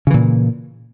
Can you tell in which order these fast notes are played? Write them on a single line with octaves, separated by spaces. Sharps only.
C#3 E3 A#2